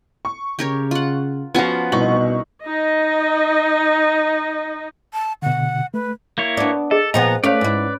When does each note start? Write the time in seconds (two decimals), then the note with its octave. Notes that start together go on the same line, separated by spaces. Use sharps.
0.25 C#6
0.59 C#3 G4 A#4 C#5
0.91 F4 F#5
1.55 F3 B3 C#4 F4 F#4 G#5 C#6
1.92 C2 B2 D#4 C#6 F#7
2.63 D#4 D#5
5.13 A5
5.42 B2 D3 F#5
5.94 A3 B4
6.38 A#3 E4 C#5
6.57 B3 D4
6.91 G#4 A4 D#5
7.14 A#2 F3 B3 D#5 G5 A#5
7.44 A3 C#4 B4 C#5 D5 F5
7.61 G#2 E4